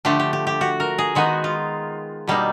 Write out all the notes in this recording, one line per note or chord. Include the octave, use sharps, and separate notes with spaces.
D3 F3 A3 D4 G4
G4
G4
G4
F#4
A#4
G#4
D#3 G#3 B3 D#4 F#4
F4
B2 G3 A#3 D#4